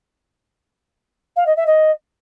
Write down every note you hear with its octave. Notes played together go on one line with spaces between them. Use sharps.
F5
D#5
E5
D#5